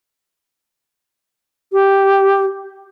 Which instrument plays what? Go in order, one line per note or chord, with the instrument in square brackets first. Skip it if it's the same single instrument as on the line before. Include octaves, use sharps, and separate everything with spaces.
[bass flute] G4